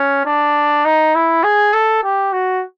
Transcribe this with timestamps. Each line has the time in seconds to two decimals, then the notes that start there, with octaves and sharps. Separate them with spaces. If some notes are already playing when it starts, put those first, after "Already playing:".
Already playing: C#4
0.25 D4
0.85 D#4
1.15 E4
1.43 G#4
1.73 A4
2.03 G4
2.32 F#4